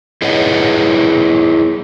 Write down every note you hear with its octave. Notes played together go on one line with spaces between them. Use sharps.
E4 G#4 B4 C#5 D#5 F#5